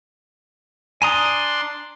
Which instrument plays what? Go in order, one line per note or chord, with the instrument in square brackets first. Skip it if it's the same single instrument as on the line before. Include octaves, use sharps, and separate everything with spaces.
[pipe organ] D4 C6 [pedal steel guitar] G#5 A#5 D#6